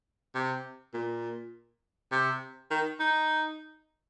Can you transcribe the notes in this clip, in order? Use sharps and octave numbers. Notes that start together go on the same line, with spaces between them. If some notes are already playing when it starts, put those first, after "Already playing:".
C3
A#2
C3
D#3
D#4